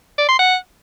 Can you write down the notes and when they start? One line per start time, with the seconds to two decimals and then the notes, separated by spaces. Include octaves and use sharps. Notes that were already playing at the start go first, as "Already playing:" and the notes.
0.18 D5
0.29 C6
0.39 F#5